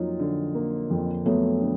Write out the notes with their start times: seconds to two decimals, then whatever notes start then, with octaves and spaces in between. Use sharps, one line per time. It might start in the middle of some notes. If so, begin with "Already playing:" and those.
Already playing: F2 F#3 A#3 D#4 F4
0.20 D3
0.55 A#3
0.90 F2
1.26 F#3 A3 B3
1.61 D3